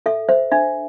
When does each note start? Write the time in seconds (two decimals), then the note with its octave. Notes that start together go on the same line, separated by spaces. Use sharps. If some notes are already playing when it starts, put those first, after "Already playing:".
0.06 A4 E5
0.29 C5 E5
0.52 D4 E5